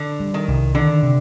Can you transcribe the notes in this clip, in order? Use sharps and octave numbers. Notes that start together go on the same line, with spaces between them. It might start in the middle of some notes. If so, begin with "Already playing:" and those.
Already playing: D3
G3
D#3
C2
D3 D#3
C3